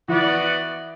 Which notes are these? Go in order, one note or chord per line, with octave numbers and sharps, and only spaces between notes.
E3 B3 F#4 B4 D5